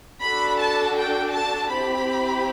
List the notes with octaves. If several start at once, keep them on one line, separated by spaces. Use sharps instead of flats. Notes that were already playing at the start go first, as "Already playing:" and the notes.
D4 F#4 A4 B5
A5
G5
A5
C4 E4 G4 B5